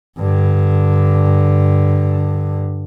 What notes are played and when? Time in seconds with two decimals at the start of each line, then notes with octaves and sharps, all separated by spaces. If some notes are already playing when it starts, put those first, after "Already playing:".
0.19 G2 D3